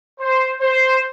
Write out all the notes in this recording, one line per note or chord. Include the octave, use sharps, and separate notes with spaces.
C5
C5